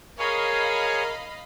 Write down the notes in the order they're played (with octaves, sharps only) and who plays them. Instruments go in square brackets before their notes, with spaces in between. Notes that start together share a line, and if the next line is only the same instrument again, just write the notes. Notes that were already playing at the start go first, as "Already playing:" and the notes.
[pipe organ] G#4 C#5 [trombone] A#4 [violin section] D#5 F5 B5